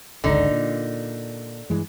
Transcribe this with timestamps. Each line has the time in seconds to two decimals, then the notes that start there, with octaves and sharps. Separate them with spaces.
0.24 D1 G#1 C#2 D3 D#4
0.51 A#2
1.70 G2 E3 G#3